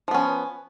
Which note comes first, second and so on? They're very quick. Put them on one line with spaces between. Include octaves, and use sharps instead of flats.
F3 B3 C#4